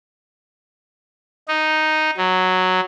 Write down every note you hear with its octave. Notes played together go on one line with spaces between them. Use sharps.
D#4
F#3